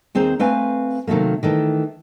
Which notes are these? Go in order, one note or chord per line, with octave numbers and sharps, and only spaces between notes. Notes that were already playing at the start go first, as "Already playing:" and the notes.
D#2 C4 G#4 C5 A#5
A3 C4 B4 F5 G#5
C3 D#3 F#3 A3 A#3
D#3 E3 A3